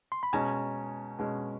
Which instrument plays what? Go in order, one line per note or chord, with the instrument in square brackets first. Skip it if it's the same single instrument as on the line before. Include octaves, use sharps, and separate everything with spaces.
[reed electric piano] C6
B5
[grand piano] B2 G#3 C#4 [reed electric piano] G#5 A#5
[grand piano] B2 G#3 C#4